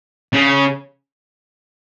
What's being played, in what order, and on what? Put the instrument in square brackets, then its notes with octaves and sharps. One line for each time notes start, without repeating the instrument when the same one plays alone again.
[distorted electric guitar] C#3